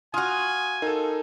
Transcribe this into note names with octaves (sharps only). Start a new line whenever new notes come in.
F4 F#4 G#5 D#6 F6
D#4 A4 A#4